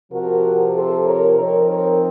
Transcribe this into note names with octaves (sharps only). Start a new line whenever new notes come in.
C3 F3 C4 F#4 A#4
A4 C5
A#4 C#5
F3 C4 D#4 A#4 C#5
A#4 C#5